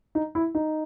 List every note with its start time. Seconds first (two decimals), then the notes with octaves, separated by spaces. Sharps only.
0.15 D#4
0.35 E4
0.55 D#4